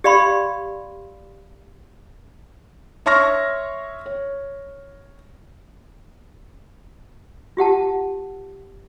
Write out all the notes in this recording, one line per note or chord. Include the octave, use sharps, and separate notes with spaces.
G4 D5 F5 B5 C6
C#5 E5 C6 C#6 F6 A#6
C#5
F4 G4 F#5 A5